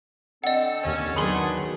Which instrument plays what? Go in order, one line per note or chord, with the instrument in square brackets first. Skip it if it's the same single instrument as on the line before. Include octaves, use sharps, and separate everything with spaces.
[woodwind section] D3 C4 A4 [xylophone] D#5 F#5
[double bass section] D#2 [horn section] C#4
[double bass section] D#3 F#3 B3 [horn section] A3 D4 G#4 [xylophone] B5 C6